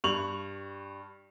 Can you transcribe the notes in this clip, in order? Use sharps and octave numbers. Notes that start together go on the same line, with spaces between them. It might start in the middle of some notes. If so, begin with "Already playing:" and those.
G2 C#6 F7 F#7